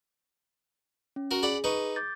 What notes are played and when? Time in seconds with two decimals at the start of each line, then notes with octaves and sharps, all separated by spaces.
1.16 C#4
1.31 F#4 A#4
1.43 G#4 D5 F#5 B5
1.64 D#4 B4 C#6
1.96 D6 G6 A6